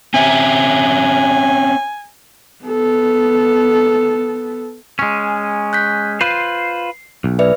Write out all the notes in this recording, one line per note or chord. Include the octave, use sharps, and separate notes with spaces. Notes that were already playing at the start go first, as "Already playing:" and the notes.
C4 C#4 E5 G#5
B3 A4
G#3 C#4
F#6 G6 B6
F4 B4 C5 C7
B1
B4 D5 E5